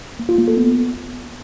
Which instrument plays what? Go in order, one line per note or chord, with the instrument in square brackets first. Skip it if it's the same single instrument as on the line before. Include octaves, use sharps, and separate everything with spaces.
[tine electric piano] A#3
F4
A#3
A4
B3